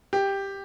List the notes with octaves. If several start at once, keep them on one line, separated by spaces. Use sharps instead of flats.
G4